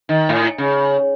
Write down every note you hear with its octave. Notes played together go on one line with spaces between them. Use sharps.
D#3
A2
C#3